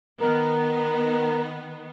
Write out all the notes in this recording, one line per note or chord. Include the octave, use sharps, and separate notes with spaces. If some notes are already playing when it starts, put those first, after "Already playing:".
D#3 B3 A#4